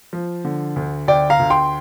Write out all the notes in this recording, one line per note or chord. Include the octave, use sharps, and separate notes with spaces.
F3
D3
D2
D2 D5 G5
F5 A#5
D2
G5 C6